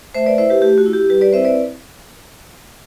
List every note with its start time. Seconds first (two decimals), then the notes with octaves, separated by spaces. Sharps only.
0.15 A3 C5 E5
0.26 B4 D5
0.38 E4 C5 E5
0.50 G4 B4
0.62 A3 G4
0.78 F#4
0.86 E4
0.93 G4
1.09 G3 G4 B4
1.21 B4 D5
1.33 C4 E4 C5 E5
1.45 B4 D5